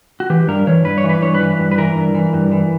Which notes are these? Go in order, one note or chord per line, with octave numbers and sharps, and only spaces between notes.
F#4
E3 G4
G2 A#4
E3 C#5
G2 B4
C#5
E3
B4
G2 C#5
B4
E3
G2
B4
E3 A#4
G2
E3
G2
E3